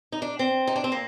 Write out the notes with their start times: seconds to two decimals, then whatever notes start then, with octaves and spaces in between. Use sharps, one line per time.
0.12 D#4
0.22 D4
0.39 C4
0.67 D#4
0.76 D4
0.84 C4
0.92 A#3